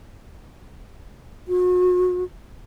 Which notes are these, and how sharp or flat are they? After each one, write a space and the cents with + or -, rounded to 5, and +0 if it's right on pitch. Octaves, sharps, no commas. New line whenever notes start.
F#4 -35